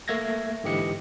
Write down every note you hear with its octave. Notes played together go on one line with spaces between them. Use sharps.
A3 A#3 E5 G#6 A#6
G#2 D3 E3 G4 D#5 C#7